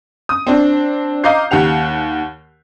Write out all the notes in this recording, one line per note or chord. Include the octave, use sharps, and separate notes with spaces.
D#6
C4 D4
D#5 F5 A#5 D6 G6 C7
D#2 G4 F#5 F7